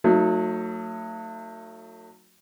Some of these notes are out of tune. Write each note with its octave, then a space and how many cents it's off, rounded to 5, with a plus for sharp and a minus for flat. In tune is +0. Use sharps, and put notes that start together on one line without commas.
F#3 -15 A3 +35 D#4 +20